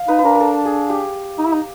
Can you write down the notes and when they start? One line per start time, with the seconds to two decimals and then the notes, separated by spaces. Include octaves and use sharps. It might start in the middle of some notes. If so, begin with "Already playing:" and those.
Already playing: F5
0.08 D#4 B4
0.19 B4
0.24 D4 A#4
0.35 A#4
0.40 A4
0.65 G#4
0.90 G4
1.38 D#4
1.45 E4
1.53 D#4